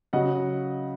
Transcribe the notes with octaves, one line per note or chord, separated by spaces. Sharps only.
C#3 F#3 D#5 F#5